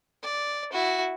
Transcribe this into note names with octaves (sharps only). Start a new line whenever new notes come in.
D5
E4 F#4